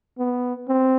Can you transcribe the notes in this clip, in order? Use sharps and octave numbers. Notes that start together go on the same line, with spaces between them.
B3
C4